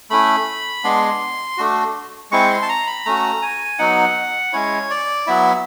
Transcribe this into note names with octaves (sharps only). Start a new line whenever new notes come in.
A3 C#4 E4 B5
G#3 B3 D4 C6
A3 D4 F#4
G#3 C4 E4 C#6
C6
A5
A#5
B5
A3 C#4 F#4 A#5
G#5
F#3 B3 D#4 F#5
G#3 C#4 E4 C#5
D5
F#3 B3 E4 E5